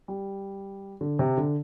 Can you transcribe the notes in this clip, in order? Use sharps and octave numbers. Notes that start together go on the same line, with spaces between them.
G3
D3
C3
D3